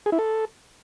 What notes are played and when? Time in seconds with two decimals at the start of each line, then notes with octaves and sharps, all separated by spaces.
0.06 G#4
0.12 E4
0.19 A4